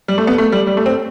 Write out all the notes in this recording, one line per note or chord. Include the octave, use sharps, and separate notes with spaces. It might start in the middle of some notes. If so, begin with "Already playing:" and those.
G3
A3
B3
A3
G3
G3
A3
C4